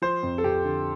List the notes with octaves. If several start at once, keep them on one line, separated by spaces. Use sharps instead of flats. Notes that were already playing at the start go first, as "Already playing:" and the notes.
F3 C5
F2
A4
F2 G4
D3